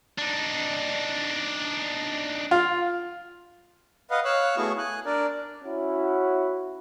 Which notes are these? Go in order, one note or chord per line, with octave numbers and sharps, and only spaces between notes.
D4 D#4
F4
B4 D#5 F5 F#5
C#5 F5 E6 F#6
A3 B3 E4 F#4 G#4 C#6
G#5 F#6
D4 A#4 D5
C#4 E4 F#4